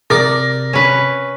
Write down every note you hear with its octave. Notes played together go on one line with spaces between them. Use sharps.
C3 A#4 D5 A#6
C#4 B4